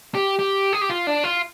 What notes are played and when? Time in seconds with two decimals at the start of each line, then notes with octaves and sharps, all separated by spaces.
0.15 G4
0.39 G4
0.73 G#4
0.81 G4
0.90 F4
1.07 D4
1.24 F4